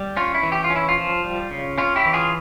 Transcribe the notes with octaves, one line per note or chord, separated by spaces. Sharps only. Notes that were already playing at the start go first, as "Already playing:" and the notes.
Already playing: G3
C#4 F4
E4
E3
G4
F4
C#4
E4
F4
F3
G3
C#3
C#4 F4
E4 G4
E3
F4 G#4